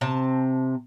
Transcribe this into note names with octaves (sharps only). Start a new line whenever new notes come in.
C3 C4 A5